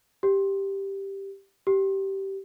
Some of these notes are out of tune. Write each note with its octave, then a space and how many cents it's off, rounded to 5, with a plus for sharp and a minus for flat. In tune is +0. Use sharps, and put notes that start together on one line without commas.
G4 +0
G4 -15